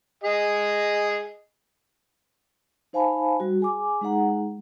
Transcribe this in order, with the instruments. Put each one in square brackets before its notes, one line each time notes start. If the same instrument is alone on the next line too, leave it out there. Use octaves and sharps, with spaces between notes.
[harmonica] G#4 D#5
[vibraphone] D#4 C5 F5 G#5 A5 B5
G3 F#4
G#4 G#5 D6
G#3 D#4 G#4 F#5 A#5